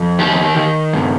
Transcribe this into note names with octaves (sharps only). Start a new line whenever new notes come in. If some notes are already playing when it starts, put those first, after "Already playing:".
Already playing: F2
D#3 G4
D#3
G2